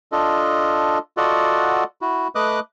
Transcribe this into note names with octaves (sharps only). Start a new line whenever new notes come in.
D4 F4 A4 D#5
F4 F#4 A4 D5 D#5 F#5
E4 F#4
A3 B4 D#5 D6 D#6 F#6